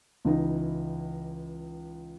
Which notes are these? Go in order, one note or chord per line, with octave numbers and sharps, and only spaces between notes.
C#2 E3 D#4